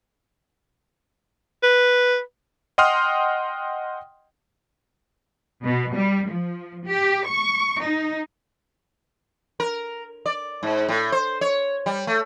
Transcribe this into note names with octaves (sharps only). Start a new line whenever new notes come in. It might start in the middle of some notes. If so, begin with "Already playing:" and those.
B4
D#5 F#5 G5 C6 D#6 F6
B2
G3
F3
G4
C#6
D#4
A#4
D5
G#2
A2
C5
C#5
G3
A3